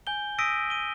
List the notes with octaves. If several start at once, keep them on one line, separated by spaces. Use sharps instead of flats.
G#5 G6 G7
D#6 E6 A#6 B6 D7 D#7
D#7 G7